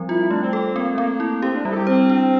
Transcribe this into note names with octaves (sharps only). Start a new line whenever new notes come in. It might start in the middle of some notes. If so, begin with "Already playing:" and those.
Already playing: F3 G3 C4
E4 F4
E4
A3 D4
C4
C4 A4
A#3 C4
A3
A#3 C4
E4
C4 G4
D4
G3 E4
A4
G4
C4 C5
D4